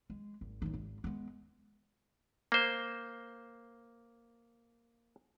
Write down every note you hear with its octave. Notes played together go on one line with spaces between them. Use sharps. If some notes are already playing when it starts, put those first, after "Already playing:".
G#3
G#1
A1 D#3
G#1
G#3 B3
A#3 C5